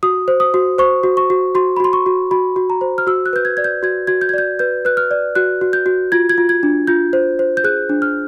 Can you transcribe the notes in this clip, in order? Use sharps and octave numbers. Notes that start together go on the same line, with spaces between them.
F#4 D#6
C5
D#6
F#4
C5 C#6
F#4
C#6
F#4
F#4 C6
B5
F#4 C6
C#6
F#4
F#4 B5
F#4
A#5
C5
F6
F#4 E6
F#6
B4 G6
G#6
D5 G#6
G6
F#4 G#6
F#4 G#6
G6
G#6
D5 G6
B4 G6
B4 F#6
F6
D5
F#4 F#6
F#4
G6
F#4
F4 G#6
G#6
F4
G#6
D4
F4 G6
C5
C5
G6
G#4 F#6
D4
F6